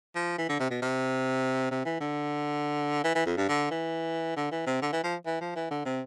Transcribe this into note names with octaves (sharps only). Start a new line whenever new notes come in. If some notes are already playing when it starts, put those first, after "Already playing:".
F3
E3
D3
C3
B2
C3
C3
E3
D3
E3
E3
F2
G2
D3
E3
D3
E3
C3
D3
E3
F3
E3
F3
E3
D3
C3